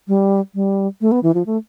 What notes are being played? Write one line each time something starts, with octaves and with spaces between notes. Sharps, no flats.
G3
G3
A3
B3
E3
F3
A3